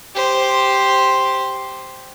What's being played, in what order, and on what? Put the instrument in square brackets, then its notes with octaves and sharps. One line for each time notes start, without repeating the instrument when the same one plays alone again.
[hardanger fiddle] G4 C5